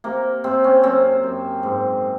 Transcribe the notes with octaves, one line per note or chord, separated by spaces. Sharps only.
C3 A#3
C3 C4
C#4
F#2 C4
F#2
G#2